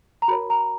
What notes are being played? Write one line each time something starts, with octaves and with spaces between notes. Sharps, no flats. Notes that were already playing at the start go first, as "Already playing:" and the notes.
A#5
F#4 A#4 C#5 B5
A#5